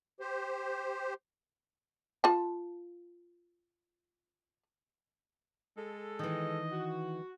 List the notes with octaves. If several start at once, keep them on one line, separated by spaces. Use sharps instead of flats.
G4 C5
F4 A5
G#3 A4
D#3 E3 D#5
F#4